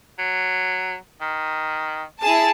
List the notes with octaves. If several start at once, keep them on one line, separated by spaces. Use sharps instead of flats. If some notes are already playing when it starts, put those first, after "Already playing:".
F#3
D#3
E4 G#4 A5